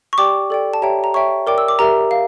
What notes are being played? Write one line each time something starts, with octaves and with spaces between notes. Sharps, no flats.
C#6
G4 D5 G5 D6
A4 D5 G5
A5
G4 C#5 E5 G5 A#5
A#5
C#5 E5 G5 C#6
A#4 D5 G5 D6
E6
D6
G4 A#4 E5 A#5
F5